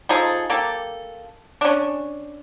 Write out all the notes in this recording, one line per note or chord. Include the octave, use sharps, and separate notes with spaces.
F3 D#4 G#4 A4
A#3 G4 A4
C#4 D4